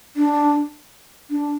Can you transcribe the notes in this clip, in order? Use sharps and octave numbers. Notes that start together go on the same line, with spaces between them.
D4
D4